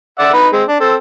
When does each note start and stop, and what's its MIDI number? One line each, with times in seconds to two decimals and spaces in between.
0.19 0.32 74
0.19 0.32 76
0.19 0.32 78
0.33 0.47 63
0.33 0.47 71
0.53 0.63 56
0.53 0.63 60
0.68 0.77 62
0.80 0.95 60
0.80 0.95 69